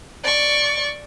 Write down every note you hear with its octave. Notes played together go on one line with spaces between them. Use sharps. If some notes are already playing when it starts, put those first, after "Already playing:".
D5 C#6